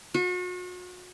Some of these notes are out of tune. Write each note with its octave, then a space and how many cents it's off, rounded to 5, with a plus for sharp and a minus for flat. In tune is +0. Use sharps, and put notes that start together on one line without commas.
F#4 -40